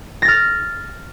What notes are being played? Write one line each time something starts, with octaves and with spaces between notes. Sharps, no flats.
F6 A6 A#6